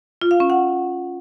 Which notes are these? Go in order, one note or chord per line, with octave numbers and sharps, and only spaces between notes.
F4
F5
C#4
F#5